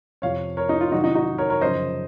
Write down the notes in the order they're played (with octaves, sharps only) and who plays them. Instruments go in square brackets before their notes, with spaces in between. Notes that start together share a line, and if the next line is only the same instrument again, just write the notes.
[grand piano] F2 C3 F3 C#5 F5
A#4 C#5
D#4
F4
C3 D#3 F#3 D#4 F#4
D#4
D#4 F#4
A#4 C#5
A#4 C#5
F#2 C#3 F3 C5 D#5